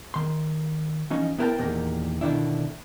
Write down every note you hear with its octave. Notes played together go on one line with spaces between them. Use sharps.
D#3 C6
E3 F3 C#4 D#4
B3 E4 A#4 C#5 G5 A5
E2 A#2 D#3 G4 A#4
B2 D3 D#3 D4 E4